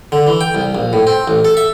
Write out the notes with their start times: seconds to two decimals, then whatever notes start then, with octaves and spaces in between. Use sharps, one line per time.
0.12 D3
0.27 E3
0.41 G5
0.55 C2
0.75 A#1
0.93 A2
1.07 C4
1.28 A1
1.45 A4
1.57 E5